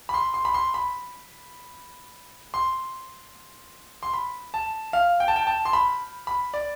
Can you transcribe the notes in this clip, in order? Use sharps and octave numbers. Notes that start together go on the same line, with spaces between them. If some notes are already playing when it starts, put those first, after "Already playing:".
B5
C6
C6
B5
C6
B5
C6
C6
B5
A5
F5
G5
A5
G5
A5
C6
B5
B5
D5